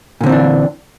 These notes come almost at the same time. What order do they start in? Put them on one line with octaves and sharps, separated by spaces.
A#2 D3 C4 E3 D4